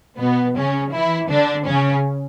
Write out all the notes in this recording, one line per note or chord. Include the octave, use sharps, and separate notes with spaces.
B2 B3
C#3 C#4
E3 E4
D3 D4
C#3 C#4